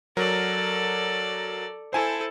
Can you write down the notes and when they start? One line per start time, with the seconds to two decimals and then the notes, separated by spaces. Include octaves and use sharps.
0.17 F#3 A4 A#4 D5
1.93 E4 A4 C5 G#5 A5